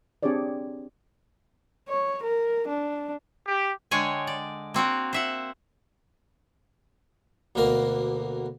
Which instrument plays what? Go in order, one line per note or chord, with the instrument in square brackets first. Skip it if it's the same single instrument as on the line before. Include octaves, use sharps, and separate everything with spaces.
[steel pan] C4 D4 G4 G#4 C#5 D5
[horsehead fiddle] C#5
A#4
D4
[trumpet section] G4
[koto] D3 G#3 C#5 G5 G#5
D5
A#3 C4 F#4 A#4
C5 E5 F#5
[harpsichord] D2 B2 A#3 A#4